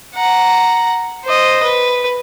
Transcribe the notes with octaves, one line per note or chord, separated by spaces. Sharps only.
F#5 A#5
C5 D#5
B4